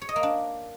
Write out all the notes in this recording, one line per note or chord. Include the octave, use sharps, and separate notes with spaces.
C#5
D#5
A#3
D4